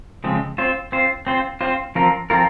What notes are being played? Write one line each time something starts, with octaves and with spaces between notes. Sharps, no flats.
C#3 F3 G#3 C4
C4 F4 C5
C4 F4 C5
C4 F4 C5
C4 F4 C5
F3 C4 F4 A#4
F3 C4 F4 A#4